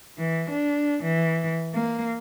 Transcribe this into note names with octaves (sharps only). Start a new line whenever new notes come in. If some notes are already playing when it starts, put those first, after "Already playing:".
E3
D4
E3
A#3